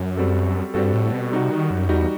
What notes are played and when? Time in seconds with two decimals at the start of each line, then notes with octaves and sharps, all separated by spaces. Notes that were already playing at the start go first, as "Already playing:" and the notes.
Already playing: F#2
0.17 G3 C4 F#4 A4
0.74 G2 G3 C4 F#4 A4
0.94 A2
1.12 B2
1.31 C3 G3 D#4 F#4
1.50 D#3
1.71 F#2
1.88 E2 G3 D#4 F#4